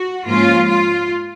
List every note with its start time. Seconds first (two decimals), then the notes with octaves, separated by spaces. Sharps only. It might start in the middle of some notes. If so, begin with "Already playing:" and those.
Already playing: F#4
0.25 G#2 F3 A#3 C#4 F4
0.66 F4